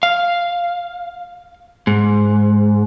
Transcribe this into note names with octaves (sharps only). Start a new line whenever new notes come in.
F5
G#2